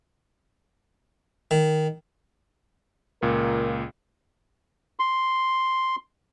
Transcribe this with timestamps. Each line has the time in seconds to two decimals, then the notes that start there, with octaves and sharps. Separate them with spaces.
1.51 D#3
3.22 C#2 A#2 A#4
4.99 C6